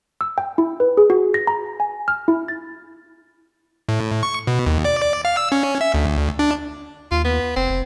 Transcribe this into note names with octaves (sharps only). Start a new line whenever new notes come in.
E6
G5
E4
B4
G#4
F#4
A#6
A#5
G#5
F6
E4
A6
A2
C#6
B2
D#2
D5
D5
F5
E6
C#4
E5
D2
D4
D#2 F4
B3
F1 C4
F1